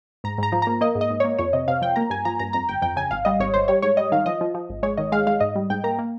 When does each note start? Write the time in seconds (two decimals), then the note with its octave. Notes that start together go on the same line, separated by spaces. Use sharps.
0.24 G#2 A#5
0.38 G#2 A#5
0.52 F3
0.62 A#3 A#5
0.81 A#3 D#5
0.95 G#2
1.01 D#5
1.10 G#2
1.20 A#3 C#5
1.39 F2 C#5
1.53 C3 D#5
1.68 C3 F5
1.82 F3 G5
1.96 A#3 A#5
2.10 G2 G#5
2.25 F3 A#5
2.39 G2 A#5
2.53 F2 A#5
2.68 G1 G5
2.82 F2 G5
2.96 C#3 G#5
3.11 G#1 F5
3.25 G3 D#5
3.40 G#1 C#5
3.54 G#1 C5
3.68 G3 C#5
3.82 G#2 C#5
3.97 G3 D#5
4.12 D#3 F5
4.26 F3 D#5
4.41 F3
4.54 F3
4.69 G#1
4.83 G#3 C#5
4.97 D#3 D#5
5.12 G#3 F5
5.27 G#3 F5
5.40 G#2 D#5
5.55 G3
5.70 G#2 G5
5.84 A#3 A#5
5.99 A#3